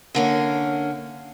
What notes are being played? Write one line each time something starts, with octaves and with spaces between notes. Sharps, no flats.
D3 A#3 C#4